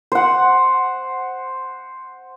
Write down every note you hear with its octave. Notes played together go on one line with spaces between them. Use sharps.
C5 F#5